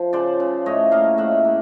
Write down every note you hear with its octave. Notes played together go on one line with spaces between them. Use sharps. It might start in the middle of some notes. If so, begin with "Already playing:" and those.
Already playing: F3
C#3 C5 D5
C#3
A2 C#5 D#5
A#3 D#5 F5
A2 E5 F#5
A#3